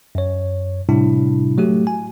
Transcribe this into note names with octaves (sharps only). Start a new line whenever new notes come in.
F#2 C#5
A2 C3 G3 D4 E4
F#3 A3 F#4 G4
G#5